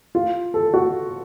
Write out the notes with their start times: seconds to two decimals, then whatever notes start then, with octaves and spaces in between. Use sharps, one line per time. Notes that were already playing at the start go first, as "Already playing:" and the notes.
0.15 F4
0.54 A4
0.74 F#4